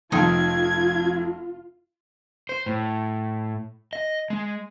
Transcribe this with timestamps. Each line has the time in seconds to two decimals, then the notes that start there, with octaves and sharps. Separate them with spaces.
0.12 F1 F2 F3 D#4 F4 G5 G#6
2.49 C5
2.66 A2
3.93 D#5
4.30 G#3